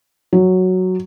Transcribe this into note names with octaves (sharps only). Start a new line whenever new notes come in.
F#3